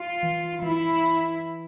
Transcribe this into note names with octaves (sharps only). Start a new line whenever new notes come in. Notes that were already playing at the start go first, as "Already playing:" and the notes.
Already playing: F4
E3
E3 E4